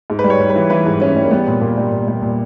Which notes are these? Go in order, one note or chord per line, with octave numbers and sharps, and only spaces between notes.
G#2
B4
G3
C#5
G3
B4
E3
E3 B4
G#2
E3 C#4
G3
A#3
G3 B3
A#2
A#2 A#3
G3
A#2
G3
A#2